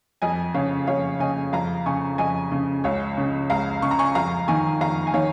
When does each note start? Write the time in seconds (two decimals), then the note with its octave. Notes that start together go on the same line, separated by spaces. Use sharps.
0.22 F2 D#5 G#5
0.54 C#3 C#5 F5
0.87 F2 C#5 F5
1.20 C#3 D#5 G#5
1.53 F2 F5 A#5
1.86 C#3 G#5 C#6
2.18 F2 D#5 G#5
2.52 C#3
2.84 C#2 C#5 F5
3.18 C#3
3.50 C#2 F5 A#5
3.82 C#3 C#6
3.91 A#5
3.99 G#5 C#6
4.15 F2 F5 A#5
4.48 D#3 G#5 C#6
4.81 F2 F5 A#5
5.07 G#5
5.14 D#3 C#5 F5